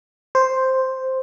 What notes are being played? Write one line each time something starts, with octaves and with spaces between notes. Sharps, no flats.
C5